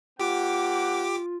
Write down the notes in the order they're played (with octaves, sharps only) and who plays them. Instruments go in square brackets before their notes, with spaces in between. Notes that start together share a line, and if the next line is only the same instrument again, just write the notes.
[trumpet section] A#3 C4 F#5 [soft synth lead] F4 [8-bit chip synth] G4 D6